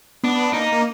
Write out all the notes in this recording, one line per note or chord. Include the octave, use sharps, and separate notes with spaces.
B3 D4
A#3 D#4
A#3